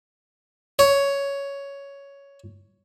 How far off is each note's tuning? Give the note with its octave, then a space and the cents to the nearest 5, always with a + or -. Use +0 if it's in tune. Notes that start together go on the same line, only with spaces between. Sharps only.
C#5 +10